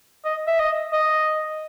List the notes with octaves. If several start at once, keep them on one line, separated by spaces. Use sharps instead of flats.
D#5
E5
D#5
D#5